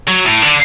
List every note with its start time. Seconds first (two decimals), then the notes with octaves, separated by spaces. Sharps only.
0.08 F#3
0.24 A2
0.42 D3